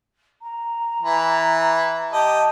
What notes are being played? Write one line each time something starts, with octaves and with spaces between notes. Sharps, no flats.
A#5
E3
G4 D#5 A5